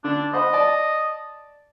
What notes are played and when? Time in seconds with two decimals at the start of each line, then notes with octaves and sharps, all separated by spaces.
0.04 D3 D4
0.33 C5 D#5 F#5 B5
0.53 D5 A5